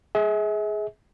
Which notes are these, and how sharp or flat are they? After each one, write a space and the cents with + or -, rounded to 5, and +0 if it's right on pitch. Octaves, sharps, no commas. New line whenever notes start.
G#4 +10 E5 -40